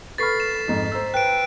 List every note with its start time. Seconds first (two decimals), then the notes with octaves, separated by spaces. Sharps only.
0.18 A4 B4 B5 C#6 F6 A6 B6 C7
0.40 E7
0.68 F2 G#2
0.92 C5 A#5 E6
1.14 B4 G5 F#6 D7